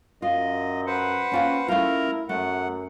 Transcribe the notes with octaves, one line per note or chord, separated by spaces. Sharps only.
F#2 F4 D#5
B4 C5 F#5
A#3 C#4 F4 G5
A3 C#4 E4 F4 A#4 A#5
F#2 A3 F#5